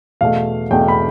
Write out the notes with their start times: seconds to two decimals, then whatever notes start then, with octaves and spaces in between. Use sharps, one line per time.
0.21 E2 B2 A3 F5
0.71 E2 B2 A3 G5
0.88 B5